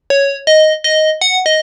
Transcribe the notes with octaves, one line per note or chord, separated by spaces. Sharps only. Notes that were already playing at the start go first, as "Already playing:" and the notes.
C#5
D#5
D#5
F#5
D#5